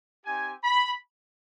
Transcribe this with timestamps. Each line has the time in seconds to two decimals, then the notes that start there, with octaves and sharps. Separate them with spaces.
0.25 C4 D#4 G4 G#5
0.64 B5